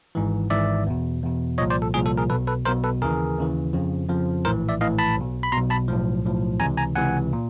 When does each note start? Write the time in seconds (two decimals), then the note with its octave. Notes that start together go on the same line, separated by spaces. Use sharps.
0.15 G#1 G#2 E3
0.50 G#1 G#2 E3 D5 E5
0.87 E2 B2
1.23 E2 B2
1.58 C2 A#2 F3 C#5 D#5
1.70 C5 D5
1.82 A4
1.93 C2 A#2 F3 G#4
2.06 A4
2.18 G#4 A#4
2.30 B1 B2 A4 B4
2.47 A4 B4
2.65 B1 B2 A#4 C5
2.84 A4 B4
3.02 D#2 C#3 E3 G#4 A#4
3.38 D#2 C#3 E3
3.73 F2 C#3 F3
4.09 F2 C#3 F3
4.45 A#1 A2 E3 A#4 C5
4.69 D5 E5
4.80 A#1 A2 E3 D#5 F5
4.99 A5 B5
5.17 B1 B2
5.43 B5
5.52 B2 A#5 C6
5.56 B1
5.70 A5 B5
5.88 B1 A2 F3
6.24 B1 A2 F3
6.60 C#2 C3 E3 G#5 A#5
6.77 G#5 A#5
6.96 C#2 C3 E3 F#5 G#5
7.33 A#2